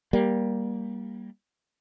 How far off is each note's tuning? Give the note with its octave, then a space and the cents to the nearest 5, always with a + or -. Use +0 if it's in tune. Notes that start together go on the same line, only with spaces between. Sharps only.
G3 +0 A#3 +15